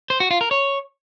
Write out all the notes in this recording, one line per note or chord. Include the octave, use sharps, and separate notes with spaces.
C5
F#4
F4
A#4
C#5